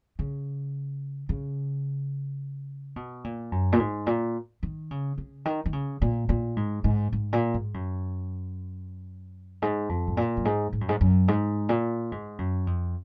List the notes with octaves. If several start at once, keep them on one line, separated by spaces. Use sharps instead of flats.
C#3
C#3
B2
A#2
F#2
A#2
G#2
A#2
D#3
C#3
C#3
D#3
D#3
C#3
A#2
A#2
G#2
G#2
G#2
A#2
G#2
F#2
G#2
F2
G#2
A#2
F#2
G#2
G#2
F#2
G#2
F#2
G#2
A#2
G#2
F#2
F2